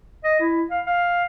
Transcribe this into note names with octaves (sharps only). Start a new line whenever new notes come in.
D#5
E4
F5
F5